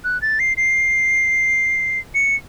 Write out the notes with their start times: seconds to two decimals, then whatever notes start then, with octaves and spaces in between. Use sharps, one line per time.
0.05 F#6
0.22 A6
0.40 C7
0.57 C7
2.15 C#7